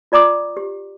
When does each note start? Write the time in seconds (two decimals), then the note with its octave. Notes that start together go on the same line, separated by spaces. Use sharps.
0.12 F4 D5 A#5 D6 D#6
0.57 G4